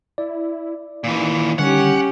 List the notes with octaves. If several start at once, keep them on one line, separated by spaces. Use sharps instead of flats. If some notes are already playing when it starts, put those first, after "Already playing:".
E4 D5
A#2 D#3 E3
D3 G3 C#4 G4 F#5